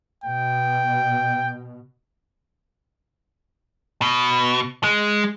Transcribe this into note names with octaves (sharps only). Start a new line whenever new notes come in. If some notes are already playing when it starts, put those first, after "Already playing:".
B2 G5
B2
G#3